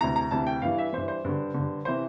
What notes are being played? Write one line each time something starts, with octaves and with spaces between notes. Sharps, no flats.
D2 C3 E3 A#5
A#5
D2 C3 E3 A5
G5
G2 E3 F5
E5
G2 E3 C5
C5
G2 D3
G2 D3
C3 E3 C5